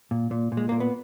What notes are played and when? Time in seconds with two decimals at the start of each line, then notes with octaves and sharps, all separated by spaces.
0.11 A#2
0.31 A#2
0.52 A#2
0.57 G#3
0.69 A#2 A#3
0.80 B3